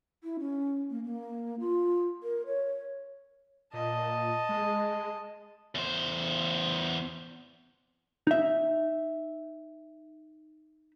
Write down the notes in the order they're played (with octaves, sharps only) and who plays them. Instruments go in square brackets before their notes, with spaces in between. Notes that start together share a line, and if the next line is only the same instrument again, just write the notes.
[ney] E4
C#4
A#3
A#3
F4
A#4
C#5
[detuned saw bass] A#2 [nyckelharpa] D#5 A5
[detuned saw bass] G#3
[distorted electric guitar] E2 C5
[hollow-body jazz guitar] D#4 E5